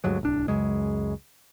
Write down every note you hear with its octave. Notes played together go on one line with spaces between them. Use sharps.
D2 G2 F#3 G#3
D1 C2 D4
C#2 F#2 C#3 G#3